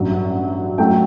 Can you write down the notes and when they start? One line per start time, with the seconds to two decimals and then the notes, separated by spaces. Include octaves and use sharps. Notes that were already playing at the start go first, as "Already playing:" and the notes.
Already playing: A1 G2 F#3
0.78 F#2 F#3 A3 G5